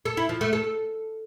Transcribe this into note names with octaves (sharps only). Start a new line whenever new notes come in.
A4
E4
F3
A3
A4